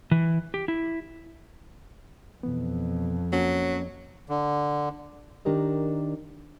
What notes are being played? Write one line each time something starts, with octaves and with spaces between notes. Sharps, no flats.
E3
G4
E4
F2 B2 E3 B3
F#3 A#3 C#4
D3
D#3 D4 G4 A#4 D#5